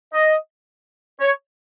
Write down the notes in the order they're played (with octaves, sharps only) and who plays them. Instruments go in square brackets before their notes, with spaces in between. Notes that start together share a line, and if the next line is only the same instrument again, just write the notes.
[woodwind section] D#5
C#5